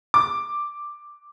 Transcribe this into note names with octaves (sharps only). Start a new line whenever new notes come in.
D6